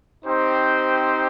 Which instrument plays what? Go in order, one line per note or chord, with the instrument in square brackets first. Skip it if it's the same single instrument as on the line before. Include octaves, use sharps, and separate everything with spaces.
[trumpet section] C4 D#4 G4 C5